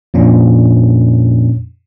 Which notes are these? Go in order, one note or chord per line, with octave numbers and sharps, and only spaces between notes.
F2 A#2 C#4 D4